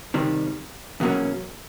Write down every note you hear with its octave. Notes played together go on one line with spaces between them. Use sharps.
C3 D#3 G3
E2 B2 F#3 A#3 C#4